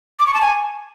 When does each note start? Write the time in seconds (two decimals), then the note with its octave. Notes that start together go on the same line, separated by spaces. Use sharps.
0.19 D6
0.27 C#6
0.34 A5
0.41 G#5